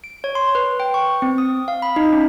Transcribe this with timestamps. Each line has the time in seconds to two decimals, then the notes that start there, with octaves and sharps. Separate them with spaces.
0.04 D7
0.24 C#5
0.35 C6
0.55 B4
0.80 G5
0.94 C#6
1.22 C4
1.38 D#6
1.68 F5
1.82 B5
1.96 D#4
2.13 C#4